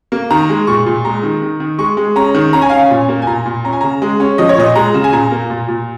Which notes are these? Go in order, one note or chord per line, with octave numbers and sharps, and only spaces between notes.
A#3
D#3 A#5
G#3
A#2 C#6
A#2
G#3 A#5
D#3
D#3
D#3
G#3 C#6
G#3
C#4 A#5
D#3
C#4 A#5
G#5
C#4 F5
G#5
A#2
A#3
G#5
A#2 A#5
A#2
C#4 A#5
G#5
C#3 A#5
G#3
C#4
F3 D#5
C#5
A#2 D#5
G#3 A#5
C#3
G#5
A#2 A#5
A#3
A#2
A#2